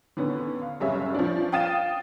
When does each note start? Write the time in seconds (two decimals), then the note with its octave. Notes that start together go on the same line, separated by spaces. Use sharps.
0.17 D3 D#3 B3 C#4
0.61 F5
0.80 F#1 G3 C#4 G#4 E5
1.14 F3 C#4 D4
1.52 F5 G5 D#6 A6 D#7 E7